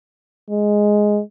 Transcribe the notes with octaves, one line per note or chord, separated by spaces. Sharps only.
G#3